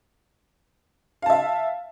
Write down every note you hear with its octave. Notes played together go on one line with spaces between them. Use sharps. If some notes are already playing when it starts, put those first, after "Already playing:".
E5 F5 A5